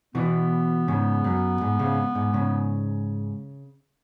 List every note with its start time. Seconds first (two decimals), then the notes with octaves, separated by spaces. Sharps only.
0.15 B2 E3 B3
0.88 G#2 C#3
1.24 F#2
1.61 G#2
1.79 G#2 C#3
2.15 G#2
2.34 G#2 C#3